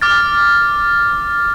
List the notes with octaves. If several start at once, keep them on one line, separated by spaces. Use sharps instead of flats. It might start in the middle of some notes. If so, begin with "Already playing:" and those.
D6 F6 A6